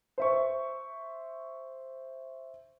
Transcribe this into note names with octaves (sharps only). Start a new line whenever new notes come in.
C5 E5 C#6